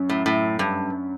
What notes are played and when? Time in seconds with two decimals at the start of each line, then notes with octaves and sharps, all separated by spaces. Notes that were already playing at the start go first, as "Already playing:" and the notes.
Already playing: F#2
0.09 A2
0.26 A2
0.59 G2